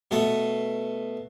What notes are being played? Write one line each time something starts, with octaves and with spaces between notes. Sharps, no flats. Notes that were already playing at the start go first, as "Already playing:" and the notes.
B2 A3